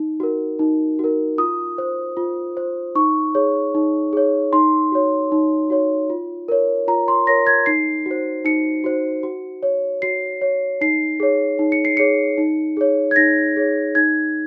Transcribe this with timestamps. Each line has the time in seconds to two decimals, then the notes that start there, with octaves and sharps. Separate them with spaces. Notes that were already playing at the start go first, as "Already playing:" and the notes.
Already playing: D#4
0.20 F#4 A#4
0.59 D#4
0.99 F#4 A#4
1.38 F4 D#6
1.78 C5
2.17 F4
2.57 C5
2.95 D#4 C#6
3.35 G#4 C#5
3.75 D#4
4.13 G#4 C#5
4.53 D#4 C6
4.92 F#4 C#5
5.32 D#4
5.70 F#4 C#5
6.10 F4
6.48 A#4 C#5
6.88 F4 A#5
7.08 C6
7.27 A#4 C#5 A#6
7.47 G#6
7.66 D#4 C7
8.06 F#4
8.11 C5
8.45 D#4 C#7
8.84 F#4 C5
9.23 F#4
9.63 C#5
10.02 F#4 C7
10.41 C#5
10.81 D#4 C7
11.20 G#4 C#5
11.59 D#4
11.72 C#7
11.85 C7
11.97 G#4 C#5 C#7
12.38 D#4
12.77 G#4 C#5
13.11 G#6
13.16 D#4 A#6
13.56 G#4 C#5
13.95 D#4 G#6